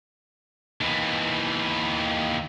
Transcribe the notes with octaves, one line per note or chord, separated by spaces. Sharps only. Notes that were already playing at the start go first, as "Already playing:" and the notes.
D#2 E3